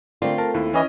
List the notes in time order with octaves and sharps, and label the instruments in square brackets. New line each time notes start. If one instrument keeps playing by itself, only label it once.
[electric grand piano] D3 A#4 D5 [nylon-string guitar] A3 C4 F4
[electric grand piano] A#4 A5
[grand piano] D#2 [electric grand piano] E4
[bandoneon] E3 [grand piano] C#4 D#5